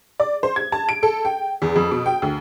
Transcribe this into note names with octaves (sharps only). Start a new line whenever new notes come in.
D5
C5
G#6
A5
D7
A4
G5
E2
F2
B2
G5
D2